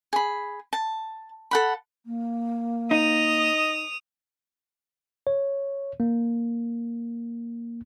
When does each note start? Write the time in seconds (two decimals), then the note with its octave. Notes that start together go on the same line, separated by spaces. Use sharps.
0.13 G#4 B5
0.73 A5
1.51 A4 F#5 B5
2.06 A#3
2.91 D#4 D#5 D#6 F7
5.27 C#5
6.00 A#3